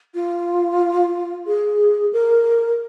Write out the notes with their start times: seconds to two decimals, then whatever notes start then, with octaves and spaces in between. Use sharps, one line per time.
0.15 F4
1.47 G#4
2.13 A#4